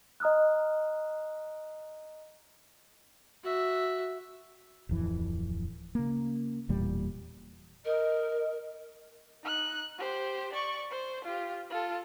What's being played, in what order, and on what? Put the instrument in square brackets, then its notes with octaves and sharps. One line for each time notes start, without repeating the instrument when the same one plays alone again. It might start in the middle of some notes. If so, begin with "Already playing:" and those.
[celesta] D#5 A#5 D#6 F6 F#6
[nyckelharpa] F#4 E5
[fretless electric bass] D1 F2 E3
C#3 A#3
E1 E2 A#2 G3
[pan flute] A#4 [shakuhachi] D#5
[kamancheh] D#4 F#6
G4 C5
D5 C#6
C5
F4 G4
F4 A4